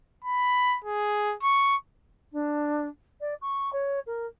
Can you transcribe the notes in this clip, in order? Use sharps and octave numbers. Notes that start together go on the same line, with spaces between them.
B5
G#4
C#6
D4
D5
C#6
C#5
A#4